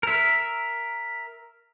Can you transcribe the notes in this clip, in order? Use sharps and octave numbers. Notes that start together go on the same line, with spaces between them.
A#4 E5